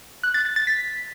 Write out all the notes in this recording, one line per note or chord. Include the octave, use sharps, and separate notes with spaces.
F#6
A6
A6
A6
B6